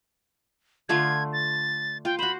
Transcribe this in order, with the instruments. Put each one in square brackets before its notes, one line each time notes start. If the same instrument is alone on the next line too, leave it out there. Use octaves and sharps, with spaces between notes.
[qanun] D3 A3 F4 [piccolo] G#6
[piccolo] A6
[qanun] F4 [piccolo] G5
[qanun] F#4 C5 [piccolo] B5